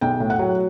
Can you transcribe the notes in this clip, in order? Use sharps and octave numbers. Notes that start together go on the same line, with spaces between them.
B1 G5
A2
F#5
F#3